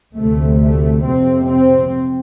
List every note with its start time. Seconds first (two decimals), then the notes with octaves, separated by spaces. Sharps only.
0.16 D2 C3 A3
0.61 A3
1.05 F2 C3 C4
1.51 C4